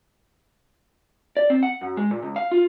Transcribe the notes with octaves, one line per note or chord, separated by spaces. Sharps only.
D5
C4
F#5
F#2
G#3
A#2
C#2
F5
F4